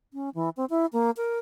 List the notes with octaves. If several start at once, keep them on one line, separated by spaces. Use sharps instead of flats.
C#4
E3
C4
E4
A#3
A#4